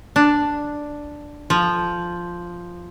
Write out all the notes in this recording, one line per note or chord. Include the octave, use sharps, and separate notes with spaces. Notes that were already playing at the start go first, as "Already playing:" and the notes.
D4
F3